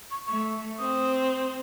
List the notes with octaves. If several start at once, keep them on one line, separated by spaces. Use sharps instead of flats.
C#6
A3 C#6
C4 D#6